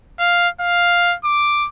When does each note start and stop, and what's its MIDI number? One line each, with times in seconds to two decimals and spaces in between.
0.19 0.49 77
0.60 1.15 77
1.25 1.68 86